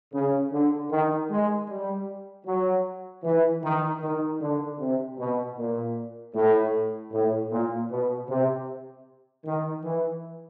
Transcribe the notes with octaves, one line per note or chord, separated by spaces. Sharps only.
C#3
D3
D#3
G#3
G3
F#3
E3
D#3
D#3
D3
C3
B2
A#2
A2
A2
A#2
B2
C3
D#3
E3